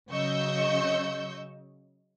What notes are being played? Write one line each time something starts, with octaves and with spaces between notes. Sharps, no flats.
C#3 F#3 D#5 C#6 E6 G6